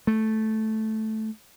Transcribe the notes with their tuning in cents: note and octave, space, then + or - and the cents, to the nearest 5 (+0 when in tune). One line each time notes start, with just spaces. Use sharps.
A3 -5